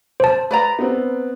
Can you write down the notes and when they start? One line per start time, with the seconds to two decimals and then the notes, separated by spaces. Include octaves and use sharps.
0.20 C5 A5
0.51 B4 D5 A#5
0.79 B3 C4